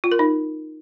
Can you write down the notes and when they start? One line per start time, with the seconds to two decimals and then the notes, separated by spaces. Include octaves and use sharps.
0.04 F4
0.12 A#4
0.19 D#4